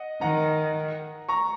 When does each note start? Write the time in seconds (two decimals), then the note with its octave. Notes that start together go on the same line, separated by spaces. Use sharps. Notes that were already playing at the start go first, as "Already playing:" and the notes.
Already playing: D#5 F#5
0.21 D#3 F#5 A#5
1.29 A#5 C#6